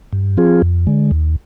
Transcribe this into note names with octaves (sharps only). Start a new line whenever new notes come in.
G2
F3 C4 F4 G#4
F2
D3 G#3
D#2